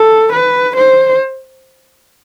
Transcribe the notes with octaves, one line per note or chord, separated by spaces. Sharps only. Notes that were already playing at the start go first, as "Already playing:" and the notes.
Already playing: A4
B4
C5